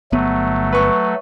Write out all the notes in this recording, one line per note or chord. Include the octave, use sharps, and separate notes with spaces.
G1 F#3 A3 B3
B4 C#6